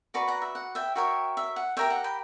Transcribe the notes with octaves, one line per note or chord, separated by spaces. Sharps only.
F#4 B4 D5 A#5 C#6
F#5 A#5
E5
F#5
E5 G5
F#4 A#4 C#5 E5 G5
E5
F#5
G4 A#4 C#5 E5 G5
F#5 A#5
G5 B5